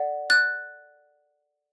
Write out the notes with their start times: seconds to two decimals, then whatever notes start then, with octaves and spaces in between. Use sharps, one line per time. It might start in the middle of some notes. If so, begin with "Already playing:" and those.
Already playing: A4 D5 F#5
0.30 F#6 A6